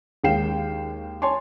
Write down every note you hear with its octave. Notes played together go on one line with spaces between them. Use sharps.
D#2 G#3 F5 G5 C7 E7
C#5 G#5 A5 C6